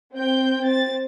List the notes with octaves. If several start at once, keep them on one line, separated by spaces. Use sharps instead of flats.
C4 G5 G6
C4 A6